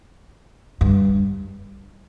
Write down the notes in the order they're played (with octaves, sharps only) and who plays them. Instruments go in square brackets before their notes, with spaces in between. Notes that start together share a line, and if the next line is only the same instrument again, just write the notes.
[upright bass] G2